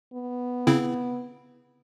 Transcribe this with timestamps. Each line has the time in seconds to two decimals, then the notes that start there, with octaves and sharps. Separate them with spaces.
0.14 B3
0.67 C#3 C4 E4